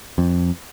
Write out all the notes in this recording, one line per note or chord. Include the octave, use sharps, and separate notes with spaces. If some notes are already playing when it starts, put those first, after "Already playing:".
F2